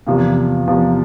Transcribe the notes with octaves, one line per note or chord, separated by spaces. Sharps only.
E2 C3 F3 A#3
E2 C3 F3 A#3